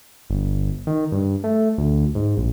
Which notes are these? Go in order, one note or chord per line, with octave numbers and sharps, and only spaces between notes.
G1
D#3
G2
A3
D2
G#2
A#1